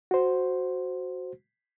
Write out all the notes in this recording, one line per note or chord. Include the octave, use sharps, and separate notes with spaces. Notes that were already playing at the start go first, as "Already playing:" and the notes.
F#4 C5